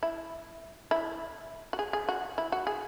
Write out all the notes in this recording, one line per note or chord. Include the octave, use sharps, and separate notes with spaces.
E4
E4
F#4
G#4
G#4
F#4
E4
F#4
G#4